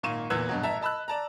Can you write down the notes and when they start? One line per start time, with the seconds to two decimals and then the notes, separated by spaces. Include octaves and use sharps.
0.03 G#1 A#2 A#3 C#6 D#7 E7
0.30 E2 A#2 E3 E6 F#6 G#6
0.49 G2 B2 F#3
0.63 A1 E5 A5 A#5
0.81 D#5 A5 B5 E6 F#6
1.08 D5 A5 A#5